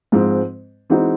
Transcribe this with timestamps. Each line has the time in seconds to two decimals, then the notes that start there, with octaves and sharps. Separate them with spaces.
0.12 G#2 F3 G#3 C4
0.90 E3 G#3 C4 D#4 F#4